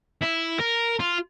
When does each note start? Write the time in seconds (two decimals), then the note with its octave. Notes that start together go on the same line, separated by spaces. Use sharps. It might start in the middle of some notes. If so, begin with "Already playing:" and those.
0.23 E4
0.61 A#4
1.00 F4